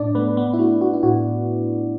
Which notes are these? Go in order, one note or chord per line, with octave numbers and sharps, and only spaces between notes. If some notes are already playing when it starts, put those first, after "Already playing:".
Already playing: A2 D4 D5
A3 B3 B4
B3 B4
E4
A3 F#4
F#4
E4
A2 F#4